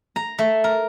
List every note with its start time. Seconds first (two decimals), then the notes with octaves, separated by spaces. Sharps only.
0.16 A#5
0.39 A3
0.64 A#4